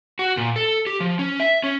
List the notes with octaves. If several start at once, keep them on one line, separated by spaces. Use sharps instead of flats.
F#4
A#2
A4
G4
F3
C#4
E5
C#4